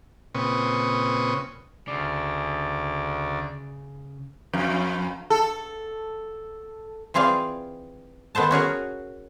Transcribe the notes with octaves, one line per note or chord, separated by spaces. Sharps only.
A#2 C#3 C4 B4 C#6 D#6
D2 C#3 D5
F2
A4
E3 C4 F4 G#4 D5 F5
D#3 B3 A4 C5 A5
C#4 F#4 G#4 A#4